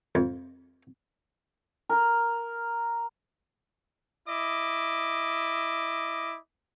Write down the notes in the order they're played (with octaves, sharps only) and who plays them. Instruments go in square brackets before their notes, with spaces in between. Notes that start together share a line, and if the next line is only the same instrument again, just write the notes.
[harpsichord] F2
[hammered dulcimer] A#4
[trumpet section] E4 D#5 D6